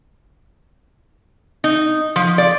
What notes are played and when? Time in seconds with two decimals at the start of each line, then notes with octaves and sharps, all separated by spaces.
1.64 D#4
2.16 F3
2.38 D5